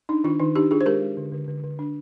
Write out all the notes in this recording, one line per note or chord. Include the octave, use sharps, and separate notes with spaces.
D4 D#4
D#3 D4 F4
D#3 D#4
D4 D#4 G4
D4 F4 G#4
C5
G#3 G4 A#4
G#3
D3
D3
D3
D3
D4